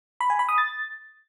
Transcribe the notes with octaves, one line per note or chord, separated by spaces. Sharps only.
B5
G#5
B5
D#6
A6